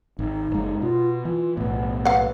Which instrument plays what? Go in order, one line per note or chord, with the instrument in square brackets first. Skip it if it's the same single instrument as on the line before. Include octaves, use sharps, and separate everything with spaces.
[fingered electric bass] G#1 [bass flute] D#4
[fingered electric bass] F#1 G#3
[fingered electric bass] B2 [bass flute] F4
[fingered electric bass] E3 [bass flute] F4
[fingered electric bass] B1 A2 [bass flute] B3
[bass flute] B4 [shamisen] F5 F#5